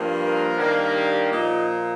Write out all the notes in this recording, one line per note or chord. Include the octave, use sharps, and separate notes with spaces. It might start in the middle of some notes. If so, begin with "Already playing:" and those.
Already playing: G2 F3 A#3
A#4
G2 D#3 G3 A#3
G4
A#2 F3 A#3 D#4